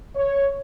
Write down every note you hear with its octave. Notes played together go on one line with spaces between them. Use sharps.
C#5